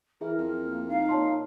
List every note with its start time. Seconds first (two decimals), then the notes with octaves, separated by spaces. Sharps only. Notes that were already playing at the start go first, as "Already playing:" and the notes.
0.21 E3 E4 G#4 A#4 E5
0.38 F2
0.66 A#3
0.88 D#4 F5
1.09 A#2 C#5 A5 C6